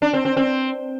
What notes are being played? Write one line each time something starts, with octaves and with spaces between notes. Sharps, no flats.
D4
C4
C4
C4